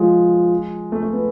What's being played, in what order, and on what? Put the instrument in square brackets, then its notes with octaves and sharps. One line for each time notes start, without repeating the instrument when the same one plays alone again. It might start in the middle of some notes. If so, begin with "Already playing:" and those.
Already playing: [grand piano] F3 G#3
A3
A3
B3